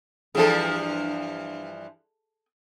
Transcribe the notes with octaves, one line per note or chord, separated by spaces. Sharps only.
G2 E3 F3 G#4 A4